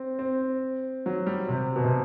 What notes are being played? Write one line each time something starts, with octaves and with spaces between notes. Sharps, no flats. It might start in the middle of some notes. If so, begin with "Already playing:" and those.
Already playing: C4
C4
F#3
G3
C3
B2
C3